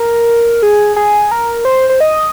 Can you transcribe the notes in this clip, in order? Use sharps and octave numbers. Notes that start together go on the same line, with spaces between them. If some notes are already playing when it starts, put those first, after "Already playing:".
Already playing: A#4
G#4
G#4
A#4
C5
C5
D#5